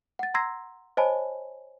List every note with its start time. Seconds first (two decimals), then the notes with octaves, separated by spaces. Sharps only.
0.19 F#5 A6
0.34 A#5 C6 E6 G#6 A#6 C7
0.97 C5 C#5 D#5 G#5 A5 B5